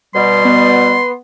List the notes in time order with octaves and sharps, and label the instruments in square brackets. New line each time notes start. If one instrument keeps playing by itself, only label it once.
[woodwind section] B2 G3 [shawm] C6
[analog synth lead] B3